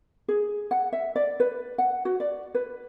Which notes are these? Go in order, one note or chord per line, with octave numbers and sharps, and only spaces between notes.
G#4
F#5
E5
D5
B4
F#5
F#4
D5
B4